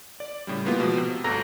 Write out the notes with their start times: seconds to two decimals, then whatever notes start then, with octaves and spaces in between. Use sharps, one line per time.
0.20 D5
0.47 A2 C#3 G3
0.65 G#3 A#3 B3 E4 F4 G4
0.80 B2 F3
0.97 C3
1.24 G1 D2 A4 A#5 A#6